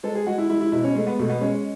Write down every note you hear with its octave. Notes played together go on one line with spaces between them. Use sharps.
G#3 A4
G#4
G#3 F#4
E4
G#3 E4
E4
B2 E4
C#4
G#3 A3
B3
B2 A3
B3
G#3 C#4